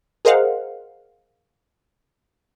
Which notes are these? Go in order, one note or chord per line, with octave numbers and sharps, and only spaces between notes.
G#4 A#4 C5 D#5 F5 F#5